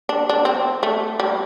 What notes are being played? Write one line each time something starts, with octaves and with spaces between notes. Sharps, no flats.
D4
D4
C4
A3
G3